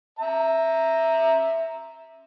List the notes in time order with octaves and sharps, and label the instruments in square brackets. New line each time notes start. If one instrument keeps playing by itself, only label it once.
[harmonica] E5 A#5